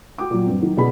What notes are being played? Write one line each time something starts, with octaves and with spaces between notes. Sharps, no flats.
F#4 G5 D6
A#2 F#3
G2 C4
D#3 F#3
B2 D3 D4 G#4 B5